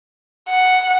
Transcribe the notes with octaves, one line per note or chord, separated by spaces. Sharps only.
F#5